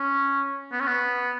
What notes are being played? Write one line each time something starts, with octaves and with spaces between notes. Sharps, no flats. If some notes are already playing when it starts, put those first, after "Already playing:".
Already playing: C#4
B3
C#4
B3